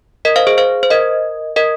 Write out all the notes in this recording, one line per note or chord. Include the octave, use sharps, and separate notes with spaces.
A#4 D#5
C5 F5
G#4 C5
C5 F5
C5
A#4 D#5
A#4 D#5